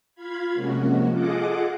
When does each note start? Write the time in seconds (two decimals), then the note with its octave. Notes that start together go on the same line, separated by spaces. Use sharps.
0.15 F4 F5 B5 G#6
0.53 C3 F3 G#3 A#3 C#4 F#4
1.10 F4 G#4 A4 D#5 F#5 D6